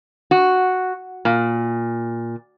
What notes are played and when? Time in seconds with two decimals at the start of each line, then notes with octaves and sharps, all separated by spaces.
0.31 F#4
1.25 A#2